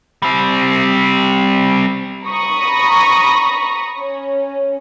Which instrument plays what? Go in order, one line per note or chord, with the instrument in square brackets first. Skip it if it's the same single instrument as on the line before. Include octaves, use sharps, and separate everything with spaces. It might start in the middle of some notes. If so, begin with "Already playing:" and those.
[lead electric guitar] G3 C4
[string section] A#5 B5 C#6 D#6
C#4